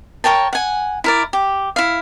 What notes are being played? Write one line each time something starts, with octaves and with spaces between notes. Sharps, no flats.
A#4 C#5 G5 A5
F#5 G#5
E4 A#4 D5
G4
E4 F5